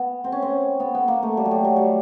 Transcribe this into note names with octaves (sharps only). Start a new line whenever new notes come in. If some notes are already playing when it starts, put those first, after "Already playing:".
Already playing: B3
C4
C#4
C4
B3
B3
A#3
A3
G3
F#3
G3
F#3
G3